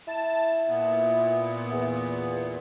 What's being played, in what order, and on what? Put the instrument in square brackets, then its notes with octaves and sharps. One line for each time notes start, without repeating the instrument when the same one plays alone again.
[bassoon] E4 [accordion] A5
[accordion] A#2 B3
[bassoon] E2